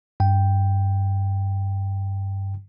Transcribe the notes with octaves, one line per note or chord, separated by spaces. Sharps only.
G2 G5